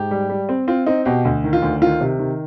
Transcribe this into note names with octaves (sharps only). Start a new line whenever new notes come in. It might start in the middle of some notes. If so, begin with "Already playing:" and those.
Already playing: G#2 G4
G3
G3
C4
C4 F4
C4 D#4
B2 G4
D2
D#3
F4
D2
D#3 F4
C3
D#3